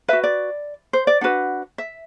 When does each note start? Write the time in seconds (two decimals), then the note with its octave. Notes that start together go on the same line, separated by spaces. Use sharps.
0.08 F#4 B4 E5
0.24 D5
0.93 C5
1.07 D5
1.21 D4 F#4 B4 F#5
1.78 E5